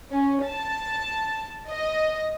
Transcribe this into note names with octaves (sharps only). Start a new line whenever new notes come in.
C#4
A5
D#5